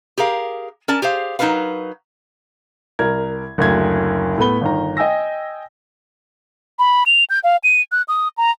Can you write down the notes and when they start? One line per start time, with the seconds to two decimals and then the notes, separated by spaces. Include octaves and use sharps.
0.18 G4 G#4 A#4 F5
0.88 C#4 A#4 D5 A5
1.02 G4 G#4 C5 F5
1.39 F#3 D#4 E4 A#4 B4 F5
2.99 C2 A#4 G#6
3.58 F#1 D2 G#6
4.38 A2 A3 B3 B5 G7
4.61 G1 D#3 A#5
4.97 D#5 G5 G#5 E6 A#6
6.79 B5
7.06 F7
7.30 G6
7.44 F5
7.64 D#7
7.92 F#6
8.08 D#6
8.37 A#5